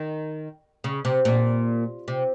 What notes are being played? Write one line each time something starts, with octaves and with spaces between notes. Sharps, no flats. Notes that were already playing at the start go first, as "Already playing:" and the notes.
Already playing: D#3
C#3
C3
A#2
C3